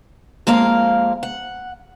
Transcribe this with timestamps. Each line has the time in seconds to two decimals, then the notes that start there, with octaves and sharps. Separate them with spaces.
0.47 F2 G#3 A#3 F5
1.23 F#5